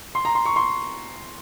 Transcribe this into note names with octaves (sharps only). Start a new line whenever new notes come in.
C6
A#5
C6
C#6
C6